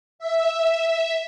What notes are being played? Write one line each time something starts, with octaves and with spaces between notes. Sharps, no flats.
E5